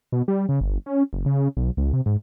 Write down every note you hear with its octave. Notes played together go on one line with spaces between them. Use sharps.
B2
G3
C#3
G1
C#4
F#1
C#3
B1
C#2
C3
G#2